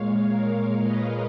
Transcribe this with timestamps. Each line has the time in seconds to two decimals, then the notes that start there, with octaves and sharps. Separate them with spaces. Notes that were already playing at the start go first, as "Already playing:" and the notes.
Already playing: A#2 G#3 C#5 F5
0.28 A#4 C#5
0.82 B4 D#5